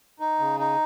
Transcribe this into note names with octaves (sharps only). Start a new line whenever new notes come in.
D#4
C#3
D#4